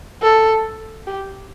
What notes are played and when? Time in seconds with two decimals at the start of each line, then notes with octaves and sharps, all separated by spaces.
0.22 A4
1.07 G4